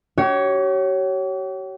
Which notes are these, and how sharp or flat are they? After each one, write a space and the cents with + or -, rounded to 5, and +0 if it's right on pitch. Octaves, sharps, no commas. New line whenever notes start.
G4 -45 C#5 +0